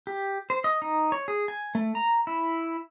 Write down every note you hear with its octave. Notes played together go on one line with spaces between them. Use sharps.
G4
C5
D#5
D#4
C#5
G#4
G#5
A3
A#5
E4